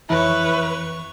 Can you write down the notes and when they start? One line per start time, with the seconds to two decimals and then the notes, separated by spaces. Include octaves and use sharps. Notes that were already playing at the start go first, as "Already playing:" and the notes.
0.10 F2 E3 E4 B4 C#5 C#6